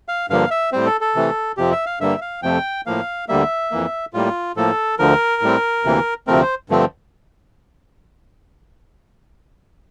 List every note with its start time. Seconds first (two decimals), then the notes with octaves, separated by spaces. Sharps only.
0.08 F5
0.30 G2 D3 F3 A#3 F5
0.51 E5
0.72 A2 G3 C4 C5
0.86 A4
1.01 A4
1.15 C3 E3 A3
1.57 F2 C3 F3 C4 G4
1.72 E5
1.86 F5
2.00 G2 D3 G3 A#3 E5
2.21 F5
2.43 F2 C3 F3 A3 G5
2.86 A2 F3 A#3 F5
3.28 D2 D3 G3 A#3 E5
3.71 F2 E3 A#3
4.14 A2 G3 A#3 F4
4.57 A2 F3 A#3 A4
4.99 D2 D3 F3 A#4
5.42 A2 G3 C4
5.84 D2 C3 E3 A#3
6.27 D2 C3 F3 A3 C4 A#4
6.42 C5
6.70 G2 D3 F3 A3 C4